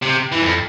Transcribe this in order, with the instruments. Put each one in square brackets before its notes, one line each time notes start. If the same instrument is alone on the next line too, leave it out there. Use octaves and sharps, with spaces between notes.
[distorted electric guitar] C3
E3
F2